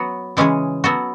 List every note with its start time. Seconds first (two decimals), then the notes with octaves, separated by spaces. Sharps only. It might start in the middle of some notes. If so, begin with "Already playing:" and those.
Already playing: F#3 B3 F#4
0.37 C#3 E3 G#3 C#4 G#4
0.84 F#3 B3 F#4 A4